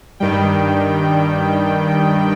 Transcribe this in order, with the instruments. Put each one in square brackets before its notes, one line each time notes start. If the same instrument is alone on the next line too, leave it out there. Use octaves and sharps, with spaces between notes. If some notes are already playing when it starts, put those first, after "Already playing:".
[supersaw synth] G2 D#3 G3 G5